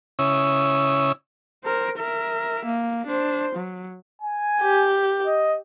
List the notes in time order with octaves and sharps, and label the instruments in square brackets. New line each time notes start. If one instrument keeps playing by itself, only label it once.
[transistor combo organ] C#3 C#4 E4 D#6 E6
[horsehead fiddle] A#4 C5
A#4 E5
A#3
D4 C5
F#3
[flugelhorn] G#5
[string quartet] G4
[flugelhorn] D#5